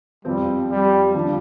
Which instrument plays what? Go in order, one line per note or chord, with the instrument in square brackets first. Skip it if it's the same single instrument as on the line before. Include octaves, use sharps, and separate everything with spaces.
[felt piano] F2 F3 C4 [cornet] G3
[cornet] G3
[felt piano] D3 F3 D4